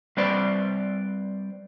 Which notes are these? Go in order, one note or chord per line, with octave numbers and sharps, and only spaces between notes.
G3 C4 B4 C5 D5 B5